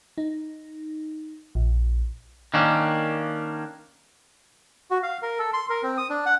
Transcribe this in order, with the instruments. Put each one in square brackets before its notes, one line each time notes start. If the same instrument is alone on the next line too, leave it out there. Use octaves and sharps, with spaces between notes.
[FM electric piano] D#4
A#1
[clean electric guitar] D#3 A#3 C#4 D4
[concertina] F#4
F5
A#4
A4
C6
A#4
C4
D#6
D4
F#5